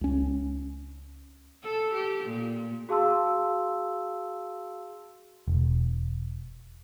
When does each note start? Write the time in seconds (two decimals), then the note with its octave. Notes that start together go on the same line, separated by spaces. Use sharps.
0.01 C#2 C#4
1.63 A4
1.94 G4
2.24 A#2
2.89 F#4 G#4 F5 A5 C6 E6
5.48 E1